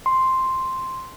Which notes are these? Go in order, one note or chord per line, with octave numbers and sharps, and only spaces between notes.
C6